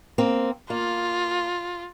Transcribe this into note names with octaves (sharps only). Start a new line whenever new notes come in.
A#3 C4
A#3 F4